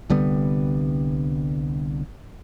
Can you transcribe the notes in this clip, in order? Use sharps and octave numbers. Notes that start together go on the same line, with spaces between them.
C2 D3 G3 B3